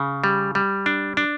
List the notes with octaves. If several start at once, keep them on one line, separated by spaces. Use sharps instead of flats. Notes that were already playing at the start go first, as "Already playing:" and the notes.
Already playing: C#3
G3
G3
D4
D4